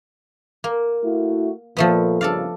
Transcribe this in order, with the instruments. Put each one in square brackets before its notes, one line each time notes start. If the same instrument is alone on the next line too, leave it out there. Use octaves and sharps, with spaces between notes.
[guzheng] A#3
[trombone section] A3 E4 F#4
[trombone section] A#2 [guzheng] F3 A3 B3
[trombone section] A#1 G2 C#3 [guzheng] A4 D5 F5